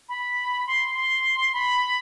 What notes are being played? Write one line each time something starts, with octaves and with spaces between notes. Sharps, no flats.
B5
C6
C6
B5